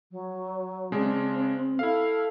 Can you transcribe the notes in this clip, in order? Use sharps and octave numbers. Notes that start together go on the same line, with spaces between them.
F#3
C#3 G#3 C4 D4
E4 A4 F5